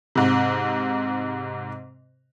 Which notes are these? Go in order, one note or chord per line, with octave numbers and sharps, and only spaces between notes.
G#2 C3